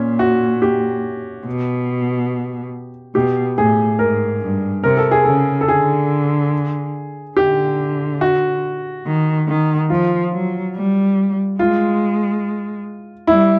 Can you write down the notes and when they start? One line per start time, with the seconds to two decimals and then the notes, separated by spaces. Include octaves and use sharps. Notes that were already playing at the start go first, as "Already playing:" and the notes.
Already playing: A#2 C#4
0.19 F#4
0.62 G4
1.46 B2
3.15 B2 G4
3.57 A2 G#4
3.99 G#2 A#4
4.42 G2
4.84 C3 A#4
4.97 A4
5.11 G#4
5.24 C#3 A4
5.61 A4
5.68 D3 G#4
7.37 D3 G4
8.21 F#4
9.06 D#3
9.48 D#3
9.90 F3 F4
10.32 F#3
10.75 G3
11.59 G#3 F4
13.27 G3 E4